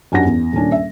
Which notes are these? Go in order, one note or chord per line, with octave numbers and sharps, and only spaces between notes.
F#2 C#4 D4 G4 F#5 A#6
E2
D#1 A#2 C#4 D4
E5